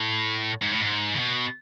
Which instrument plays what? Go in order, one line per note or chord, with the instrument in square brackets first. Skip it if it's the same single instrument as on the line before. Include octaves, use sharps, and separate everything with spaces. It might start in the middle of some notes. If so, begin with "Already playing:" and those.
Already playing: [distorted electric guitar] A2
G#2
A2
G#2
C#3
B2